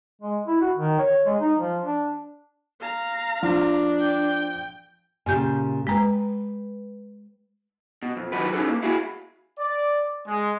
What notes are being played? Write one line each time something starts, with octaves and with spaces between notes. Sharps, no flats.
G#3
E4
F#4
D#3
C#5
G#3
D#4
F3
D4
F5 A#5
F3 D4
G5
A#2 C#3 G4 G#5 G6
G#3 B4 G5 A#5
B2
F2
D#3 F3 F#3 F#4 B4
C#4 D#4 G#4 A4 B4
A#3
E4 F#4 G#4 F5 G#5
D5
G#3